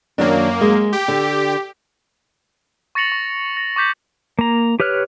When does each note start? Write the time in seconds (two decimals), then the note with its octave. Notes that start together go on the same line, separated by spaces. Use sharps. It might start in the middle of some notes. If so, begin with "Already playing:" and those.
0.18 F#2 D#3 F#3 A#3 D4
0.61 G#3
0.93 G4
1.08 D3
2.95 C#6 A6 A#6 C#7 F7 F#7
3.12 C#6
3.57 A#6
3.76 C#6 D6 G6 B6 F#7
4.39 A#3 A#5
4.80 G4 B4 C#5 F6 F#6